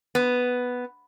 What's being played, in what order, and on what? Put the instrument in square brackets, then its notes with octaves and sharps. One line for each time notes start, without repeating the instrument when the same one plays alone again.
[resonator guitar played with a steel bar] B3